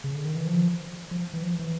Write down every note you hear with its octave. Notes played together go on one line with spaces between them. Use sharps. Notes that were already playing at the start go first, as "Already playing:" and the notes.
C#3
D3
D#3
E3
F3
F3
E3
F3
E3